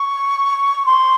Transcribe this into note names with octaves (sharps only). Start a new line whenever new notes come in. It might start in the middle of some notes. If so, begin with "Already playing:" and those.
Already playing: C#6
C6